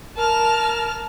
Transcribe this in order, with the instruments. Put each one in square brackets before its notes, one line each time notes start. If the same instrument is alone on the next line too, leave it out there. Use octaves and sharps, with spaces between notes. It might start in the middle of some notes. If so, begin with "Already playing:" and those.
[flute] A#4 [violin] A5 F6